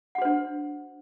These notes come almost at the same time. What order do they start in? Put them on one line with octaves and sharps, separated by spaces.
F#5 F#4 C5 D4